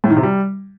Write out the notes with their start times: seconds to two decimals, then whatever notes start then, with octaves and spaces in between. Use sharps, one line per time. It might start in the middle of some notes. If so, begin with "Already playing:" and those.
0.04 A2
0.10 D#3
0.17 C3
0.23 G3